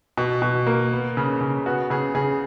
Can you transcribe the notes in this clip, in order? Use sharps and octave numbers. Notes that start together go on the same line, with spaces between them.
B2
B2
A#3
B3
C#3
C#3
B3 F#4
C#3 G#4
C#3 G#4